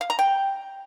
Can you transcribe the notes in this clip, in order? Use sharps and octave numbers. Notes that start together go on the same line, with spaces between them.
F5
A#5
G5